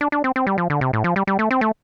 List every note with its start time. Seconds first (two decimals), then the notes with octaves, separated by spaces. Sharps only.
0.01 D4
0.12 D4
0.24 C4
0.36 C4
0.47 G3
0.58 F3
0.70 D3
0.81 C3
0.93 A2
1.04 F3
1.16 G3
1.27 G3
1.39 A3
1.51 C4
1.61 A3